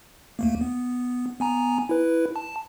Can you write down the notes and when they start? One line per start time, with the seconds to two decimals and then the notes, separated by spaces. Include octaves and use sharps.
0.39 D#2 A3 A#3
0.61 B3
1.40 B3 G#5 A#5
1.89 E4 B4
2.36 A5